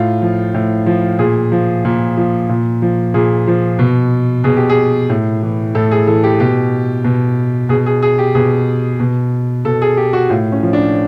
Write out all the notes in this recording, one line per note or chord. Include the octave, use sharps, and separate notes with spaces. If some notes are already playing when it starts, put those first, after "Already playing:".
Already playing: A2 F4
F3
A2
F3
A#2 G#4
F3
A#2
F3
A#2
F3
A#2 G#4
F3
B2
B2 G#4
G4
G#4
A2
E3
A2 A4
G#4
E3 A4
G4
B2 G4
B2
B2 G#4
G#4
G#4
G4
B2 G#4
B2
B2 A4
G#4
G4
F#4
A2 F4
C#4
F3
D4